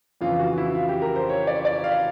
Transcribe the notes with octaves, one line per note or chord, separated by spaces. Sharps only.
F2 C#3 E3 F4
F#4
E4
F4
G4
A#4
C5
C#5
D5
D5
F5